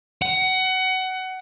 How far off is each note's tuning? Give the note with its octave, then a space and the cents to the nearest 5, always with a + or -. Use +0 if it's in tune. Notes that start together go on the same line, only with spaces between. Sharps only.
F#5 +20